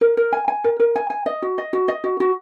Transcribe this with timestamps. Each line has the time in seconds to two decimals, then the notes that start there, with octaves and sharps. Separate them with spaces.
0.01 A#4
0.17 A#4
0.33 G#5
0.48 G#5
0.64 A#4
0.80 A#4
0.96 G#5
1.10 G#5
1.26 D#5
1.42 F#4
1.58 D#5
1.73 F#4
1.88 D#5
2.04 F#4
2.20 F#4